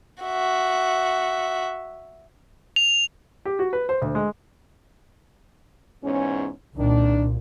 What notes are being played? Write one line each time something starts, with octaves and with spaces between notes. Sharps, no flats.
F#4 E5
F7
G4
F#4
B4
C5
D2
G#3
E2 G#2 C#4
C2 A#2 D#3 D4